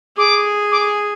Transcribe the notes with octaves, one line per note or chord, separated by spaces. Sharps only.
G#4 D6
D6